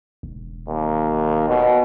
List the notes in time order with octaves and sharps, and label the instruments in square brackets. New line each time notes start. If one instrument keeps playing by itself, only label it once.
[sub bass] E1
[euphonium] D#2
B2